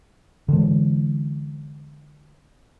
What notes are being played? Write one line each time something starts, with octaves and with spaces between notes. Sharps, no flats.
D3 E3 G#3